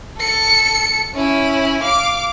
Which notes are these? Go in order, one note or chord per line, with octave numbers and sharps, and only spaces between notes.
A4 C#7
C#4 E4
F5 D6